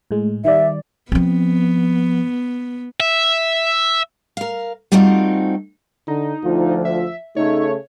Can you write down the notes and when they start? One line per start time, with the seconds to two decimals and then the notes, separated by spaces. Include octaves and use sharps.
0.11 A2 G#3
0.45 D#3 G3 D5 E5
1.12 F3 B3 C4
3.00 E5
4.37 A#4 F5
4.92 G3 A3 C4 D#4 F4 F#4
6.08 D3 D#4
6.44 D2 F3 F4
6.85 E5
7.36 C#3 A3 D#4 C#5